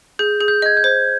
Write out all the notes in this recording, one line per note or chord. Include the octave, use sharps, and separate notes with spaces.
G#4 G6
G#4
G6
D#5 G#6
G6
C5